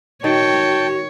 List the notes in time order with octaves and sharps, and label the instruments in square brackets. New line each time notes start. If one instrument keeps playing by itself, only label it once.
[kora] D#3 [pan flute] F#4 [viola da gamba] C#5 [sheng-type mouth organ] G5 A5